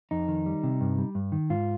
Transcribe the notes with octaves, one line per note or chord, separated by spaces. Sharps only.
F2 D#4
D#3
G3
C3
G2
G3
G2
D#3
G#2 F4